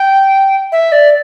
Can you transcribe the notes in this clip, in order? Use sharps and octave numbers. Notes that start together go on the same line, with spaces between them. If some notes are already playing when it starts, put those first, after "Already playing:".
Already playing: G5
E5
D5